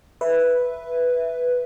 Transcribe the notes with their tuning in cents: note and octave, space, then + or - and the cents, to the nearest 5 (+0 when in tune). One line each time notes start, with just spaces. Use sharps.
B4 +0 E5 +0